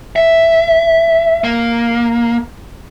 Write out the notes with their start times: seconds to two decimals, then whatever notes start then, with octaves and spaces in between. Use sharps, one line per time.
0.16 E5
1.44 A#3